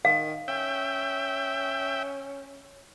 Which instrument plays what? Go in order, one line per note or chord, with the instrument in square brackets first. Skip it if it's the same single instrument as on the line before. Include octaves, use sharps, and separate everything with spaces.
[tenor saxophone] D#3 [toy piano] F5
[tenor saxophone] C#4 [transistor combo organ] E5 G5